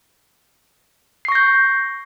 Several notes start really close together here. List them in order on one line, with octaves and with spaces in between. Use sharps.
C7 C#6 A#6 G6